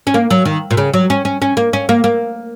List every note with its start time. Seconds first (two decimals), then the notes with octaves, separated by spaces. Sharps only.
0.07 C#4
0.14 A#3
0.30 F#3
0.45 D#3
0.71 A#2
0.77 C#3
0.94 F#3
1.10 C#4
1.25 C#4
1.42 C#4
1.57 A#3
1.73 C#4
1.89 A#3
2.04 A#3